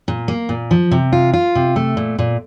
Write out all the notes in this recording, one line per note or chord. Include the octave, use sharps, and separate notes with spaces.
A#2
A#3
A#2
F3
C3
F4
F4
C3
A3
A#2
A#2